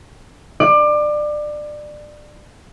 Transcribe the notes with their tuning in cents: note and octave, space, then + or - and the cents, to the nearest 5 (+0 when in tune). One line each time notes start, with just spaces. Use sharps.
D5 +25